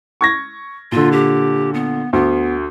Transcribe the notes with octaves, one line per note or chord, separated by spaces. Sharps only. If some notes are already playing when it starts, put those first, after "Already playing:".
C#6 G#6 A#6
A#2 D3 F4
G4
B3
D2 B3